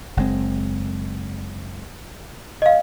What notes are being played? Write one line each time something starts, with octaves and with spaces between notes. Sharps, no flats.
F#1 G#3 C4
D#5 F5